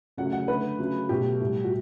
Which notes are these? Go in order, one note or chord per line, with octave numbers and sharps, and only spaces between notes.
C#3 F#3 A3 F#5
F#5
D3 A3 B4
C#3 F#3 A3
B2 F#3 A3 G4
A2 G3
F#4